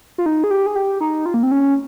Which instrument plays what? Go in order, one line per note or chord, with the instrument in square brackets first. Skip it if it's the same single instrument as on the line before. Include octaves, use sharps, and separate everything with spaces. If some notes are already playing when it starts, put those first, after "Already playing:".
[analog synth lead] F4
D#4
G#4
G4
G#4
G4
D#4
F4
A#3
C4
C#4